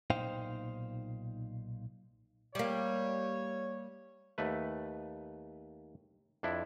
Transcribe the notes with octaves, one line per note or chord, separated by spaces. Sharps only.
B1 A#2 D#4 C5 F5 G5
G3 A#3 C#5
D#2 A3 B4
F2 D4 E4